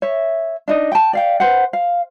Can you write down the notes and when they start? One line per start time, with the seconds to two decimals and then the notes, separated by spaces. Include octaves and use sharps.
0.02 C#5 E5
0.68 D4 D#4 D#5
0.92 G5 A5
1.13 D5 F5 G5
1.40 B4 C5 F#5
1.73 F5